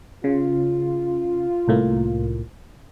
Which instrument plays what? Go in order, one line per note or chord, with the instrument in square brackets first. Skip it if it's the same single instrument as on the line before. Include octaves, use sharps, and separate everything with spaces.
[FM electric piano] C#3 [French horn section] F4
[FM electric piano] C2 A2 A#3